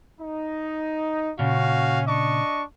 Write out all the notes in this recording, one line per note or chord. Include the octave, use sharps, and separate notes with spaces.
D#4
A#2 C#3 C#4 F#4 F5
D4 D#5 C#6